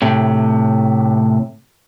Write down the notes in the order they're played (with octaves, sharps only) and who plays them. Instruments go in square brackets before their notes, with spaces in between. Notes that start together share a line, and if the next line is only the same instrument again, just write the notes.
[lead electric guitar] A2 C3